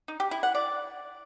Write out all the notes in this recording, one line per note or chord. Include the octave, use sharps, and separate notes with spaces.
D#4
G4
E4
F#5
D5